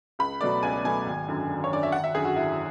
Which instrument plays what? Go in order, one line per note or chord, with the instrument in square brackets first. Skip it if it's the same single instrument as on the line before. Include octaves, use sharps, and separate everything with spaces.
[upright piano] C#2 B5
B2 F#3 A3 D5
C#2 G#5
B2 F#3 A3 G#5
G#1
F#2 D3
G#1
C#5
F#2 D3 D5
E5
G#1 F#5
E5
F#2 G#4
D3
F#4
G#1 E4